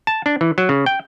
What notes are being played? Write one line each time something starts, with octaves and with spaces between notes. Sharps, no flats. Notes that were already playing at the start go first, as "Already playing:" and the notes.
A5
D4
E3
F#3
C#3
G5